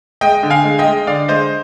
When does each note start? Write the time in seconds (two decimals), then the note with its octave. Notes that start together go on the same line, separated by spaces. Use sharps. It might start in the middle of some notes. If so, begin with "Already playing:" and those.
0.21 G#3 D#5 G5
0.43 D3
0.50 F5 G#5
0.64 G#3
0.79 D#5 G5
0.86 G#3
1.07 D3 D5 F5
1.28 G#3 C5 D#5